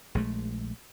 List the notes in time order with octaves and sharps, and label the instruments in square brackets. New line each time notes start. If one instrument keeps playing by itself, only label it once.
[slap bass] A#1 G#3 A3